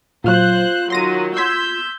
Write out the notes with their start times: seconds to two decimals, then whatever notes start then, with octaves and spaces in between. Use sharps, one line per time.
0.24 A#2 F#3 F4 C5 F#6
0.90 D#3 F#3 C6 A#6 D#7
1.37 C6 E6 G6 G#6 B6